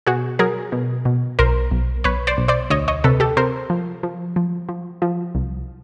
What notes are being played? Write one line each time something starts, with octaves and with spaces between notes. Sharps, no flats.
B2 F#4 G#4
F#3 G#4 A#4
B2
B2
B1 A#4 C5
B1
B1 B4 C#5
C5 D5
B1
C5 D5
D2 C#5 D#5
C#5 D#5
C3 A4 B4
G4 A4
C3 A#4 C5
F3
F3
F3
F3
F3
C2